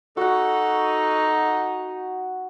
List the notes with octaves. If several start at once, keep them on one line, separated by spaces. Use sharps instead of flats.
D#4 F#4 A4 F#5